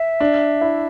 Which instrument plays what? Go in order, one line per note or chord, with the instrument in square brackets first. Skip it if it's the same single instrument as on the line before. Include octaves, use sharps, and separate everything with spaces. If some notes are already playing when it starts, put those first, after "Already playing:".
Already playing: [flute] E5
[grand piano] D4
E4